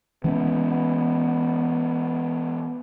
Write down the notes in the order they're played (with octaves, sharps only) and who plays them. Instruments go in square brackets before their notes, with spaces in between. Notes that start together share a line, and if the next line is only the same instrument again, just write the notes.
[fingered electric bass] E3 G#3 C#4 [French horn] B3